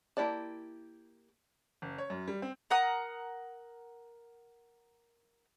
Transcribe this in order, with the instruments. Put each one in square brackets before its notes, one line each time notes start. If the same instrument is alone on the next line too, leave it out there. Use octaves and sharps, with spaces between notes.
[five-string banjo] A#3 E4 G4 D5 A5
[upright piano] F#1
C#5
F#2
G3
C4
[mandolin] A#4 F#5 D#6